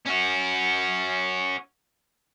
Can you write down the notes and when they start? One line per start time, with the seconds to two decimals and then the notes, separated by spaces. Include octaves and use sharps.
0.06 C#4 F#4